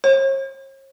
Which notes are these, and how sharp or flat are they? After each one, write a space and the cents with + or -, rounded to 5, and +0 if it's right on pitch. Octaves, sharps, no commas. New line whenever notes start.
C#5 -45